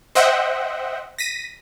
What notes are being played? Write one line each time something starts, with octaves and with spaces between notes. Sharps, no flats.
C5 D#5 E5 F#5 G5
A#6 B6 D#7